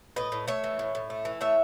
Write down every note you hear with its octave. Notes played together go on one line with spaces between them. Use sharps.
A2 B4 D#5
A2
A3 C#5 E5
E3
A2
A2
A3
E3
A3 C#5 E5